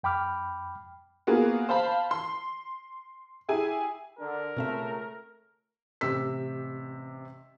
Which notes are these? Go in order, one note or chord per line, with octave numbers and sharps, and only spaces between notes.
F2 G5 B5 D6 F6
A#3 B3 F4 F#4 G#4
C5 F5 A5 B5
C6
E4 G4 G#4 G#5
D3 A#4
C#2 B2 A3 C4 E5
A1 C3 G4 E6 B6